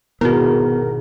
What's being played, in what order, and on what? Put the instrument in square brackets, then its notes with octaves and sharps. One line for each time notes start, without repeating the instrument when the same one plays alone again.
[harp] G#1 B2 [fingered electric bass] B3 [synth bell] E4 F#4 [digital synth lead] A#4